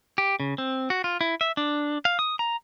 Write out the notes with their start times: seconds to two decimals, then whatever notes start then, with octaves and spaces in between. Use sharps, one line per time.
0.18 G4
0.40 C#3
0.58 C4
0.90 F#4
1.04 F4
1.21 E4
1.41 E5
1.57 D4
2.05 F5
2.19 D#6
2.39 A#5